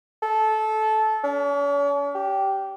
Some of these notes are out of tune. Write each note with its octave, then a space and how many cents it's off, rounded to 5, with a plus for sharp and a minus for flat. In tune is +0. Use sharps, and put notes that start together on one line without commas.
A4 -20
C#4 +45
G4 -10